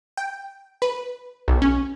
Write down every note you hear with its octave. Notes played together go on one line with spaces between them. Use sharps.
G5
B4
B1
C#4